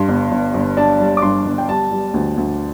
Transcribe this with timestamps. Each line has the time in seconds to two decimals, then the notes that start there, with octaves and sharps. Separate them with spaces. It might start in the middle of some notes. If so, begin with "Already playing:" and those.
Already playing: G2 C6
0.09 G1
0.31 G1
0.54 G1
0.77 D4 A5
1.00 G3
1.17 D6
1.22 G2 C6
1.46 G1
1.58 G5
1.69 G3 A5
1.91 G3
2.14 D2
2.37 D2